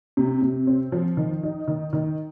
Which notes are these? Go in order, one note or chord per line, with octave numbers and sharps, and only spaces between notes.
C3
C3
C4
F3
D#3
D#4
D#3
D#3